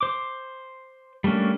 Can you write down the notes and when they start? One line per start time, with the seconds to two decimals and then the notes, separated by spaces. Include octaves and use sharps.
0.01 C5 D6
1.24 G3 A3 A#3 C#4 D4